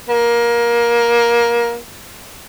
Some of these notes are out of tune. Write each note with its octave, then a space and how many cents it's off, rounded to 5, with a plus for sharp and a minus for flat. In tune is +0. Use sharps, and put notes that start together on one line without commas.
A#3 +20